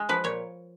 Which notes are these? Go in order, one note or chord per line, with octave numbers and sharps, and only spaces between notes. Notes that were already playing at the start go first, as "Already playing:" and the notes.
Already playing: G#3
F3 B4
A#2 C#5